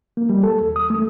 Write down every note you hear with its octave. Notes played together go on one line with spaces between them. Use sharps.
A#3
G3
A4
D#2
D#6
A3